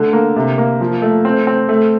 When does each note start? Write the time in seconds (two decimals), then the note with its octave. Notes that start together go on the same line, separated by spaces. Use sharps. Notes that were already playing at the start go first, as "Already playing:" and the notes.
Already playing: D3 A3
0.13 A#3
0.36 C3
0.58 A#3
0.81 F3
1.02 A3
1.25 C4
1.47 C4
1.69 A3